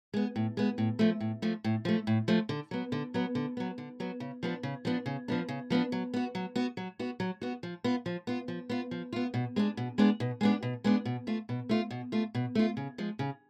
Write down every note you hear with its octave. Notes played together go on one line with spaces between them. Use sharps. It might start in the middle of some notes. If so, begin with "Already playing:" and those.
G#3 B3
A2
G#3 B3
A2
F3 A3
A2
F3 A3
A2
F3 A3
A2
F3 A3
D3
F#3 B3
D3
F#3 B3
D3
F#3 B3
D3
F#3 B3
C#3
F3 B3 D4
C#3
F3 B3 D4
C#3
F3 B3 D4
C#3
F3 B3 D4
F#3
B3 F#4
F#3
B3 F#4
F#3
B3 F#4
F#3
B3 F#4
F3
B3 F4
F3
B3 F4
F3
B3 F4
F3
B3 F4
B2
G#3 B3 D4
B2
G#3 B3 D4
B2
G#3 B3 D4
B2
G#3 B3 D4
B2
A3 F4
B2
A3 F4
B2
A3 F4
B2
A3 F4
C#3
F3 G#3
C#3